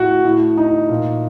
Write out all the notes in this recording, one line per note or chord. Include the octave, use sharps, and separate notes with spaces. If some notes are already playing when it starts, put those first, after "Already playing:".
Already playing: A2 F#4
A2
D#4
A#2